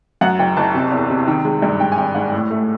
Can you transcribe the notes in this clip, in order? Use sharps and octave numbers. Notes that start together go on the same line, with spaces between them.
F#2 F#5
F#1 G5
F#1 A5
C3
E2
C3
D#3
G#3
G2
G#2 G5
G#5
G#1 G5
G#2 F#5
A2
A3